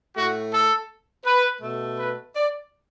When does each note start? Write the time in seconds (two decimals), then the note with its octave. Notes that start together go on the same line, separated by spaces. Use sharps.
0.15 A2 A3 F#4
0.52 A4
1.25 B4
1.61 B2 A3
1.98 B4
2.35 D5